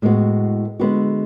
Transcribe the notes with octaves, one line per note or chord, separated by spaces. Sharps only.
A2 G#3 B3 F#4
D3 G#3 B3 F#4